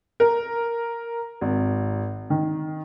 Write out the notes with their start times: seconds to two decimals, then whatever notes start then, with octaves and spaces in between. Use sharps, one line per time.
0.20 A#4
1.41 G#1
2.30 D#3